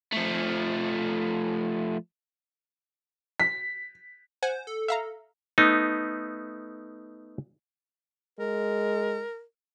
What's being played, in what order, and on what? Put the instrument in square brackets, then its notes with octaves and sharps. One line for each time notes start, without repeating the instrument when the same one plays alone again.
[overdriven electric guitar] F3 A3
[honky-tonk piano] B6
[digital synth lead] C5 [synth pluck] F#5 G#5
[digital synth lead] A4
[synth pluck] E5 F5 A#5
[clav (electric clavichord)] A3 B3 D#4
[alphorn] G#3 [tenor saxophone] A#4